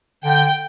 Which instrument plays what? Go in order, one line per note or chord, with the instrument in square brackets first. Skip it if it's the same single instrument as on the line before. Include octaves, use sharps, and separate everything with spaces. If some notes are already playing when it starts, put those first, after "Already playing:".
[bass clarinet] D3 [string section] G5